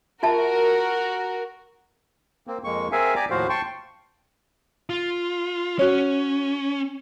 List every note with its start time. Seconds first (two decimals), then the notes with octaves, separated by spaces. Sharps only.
0.23 F4 F#4 A#4 E5 A5
2.47 A#3 C4
2.64 F2 G#3 A#3 C#6
2.92 C4 G#4 A#4 E5 F5 G#5
3.15 G4 D5 G#5 A#5 D6
3.30 D#2 A2 F3 F#4 C5 F5
3.49 G5 A5 C6 C#6
4.90 F4
5.79 C#4 F#4 C#5